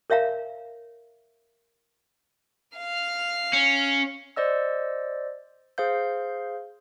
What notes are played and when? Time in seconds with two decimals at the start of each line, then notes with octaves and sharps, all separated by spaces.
0.10 A#4 C#5 E5 F5 A#5
2.77 F5 F6
3.53 C#4
4.36 C5 D5 D#5 E6
5.78 G#4 C5 F5 G6